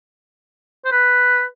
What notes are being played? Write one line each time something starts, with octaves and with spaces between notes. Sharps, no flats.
C5
B4